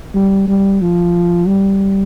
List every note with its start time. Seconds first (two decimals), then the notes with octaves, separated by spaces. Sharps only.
0.15 G3
0.48 G3
0.82 F3
1.47 G3